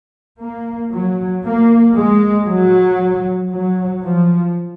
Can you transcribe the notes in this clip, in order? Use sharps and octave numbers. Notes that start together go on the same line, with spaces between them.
A#3
F#3
A#3
G#3
F#3
F#3
F3